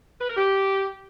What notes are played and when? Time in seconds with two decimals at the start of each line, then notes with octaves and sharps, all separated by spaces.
0.21 B4
0.28 A#4
0.36 G4